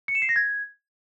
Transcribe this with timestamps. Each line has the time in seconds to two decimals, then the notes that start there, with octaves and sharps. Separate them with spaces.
0.08 C#7
0.15 E7
0.22 C7
0.29 A#6
0.36 G#6